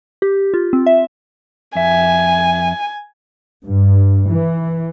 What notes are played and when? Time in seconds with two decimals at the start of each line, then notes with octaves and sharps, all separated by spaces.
0.22 G4
0.54 F4
0.73 C4
0.87 E5
1.75 F2 E5 G#5
3.67 G2
4.29 E3